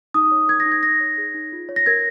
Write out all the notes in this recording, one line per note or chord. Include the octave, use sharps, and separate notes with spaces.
D#4 D#6
C#5
A#4 G#6
A#6
D#4
G#6
D#4 A#6
C#5
G#4
D#4
F4
C#5
A#6
A#4 G#6